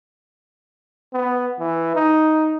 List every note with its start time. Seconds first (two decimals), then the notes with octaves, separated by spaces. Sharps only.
1.13 B3
1.59 E3
1.95 D#4